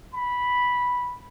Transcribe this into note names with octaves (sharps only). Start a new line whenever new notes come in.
B5